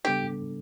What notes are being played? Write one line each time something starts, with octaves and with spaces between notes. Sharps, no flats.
C#3 G3 B3 D4 G4 A4